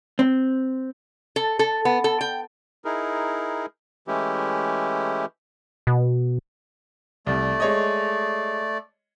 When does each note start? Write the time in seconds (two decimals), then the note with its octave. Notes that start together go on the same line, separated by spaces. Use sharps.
0.19 C4
1.36 A4
1.59 A4
1.85 B3
2.04 A4
2.21 G5
2.85 D#4 E4 G#4 A#4
4.08 E3 G#3 A3 C#4 E4 G4
5.87 B2
7.27 C2 A3 D5
7.60 G#3 C#5 D#5